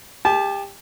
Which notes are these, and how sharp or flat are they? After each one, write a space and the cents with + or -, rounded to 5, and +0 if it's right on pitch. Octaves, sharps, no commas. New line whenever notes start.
G4 +25 A5 -25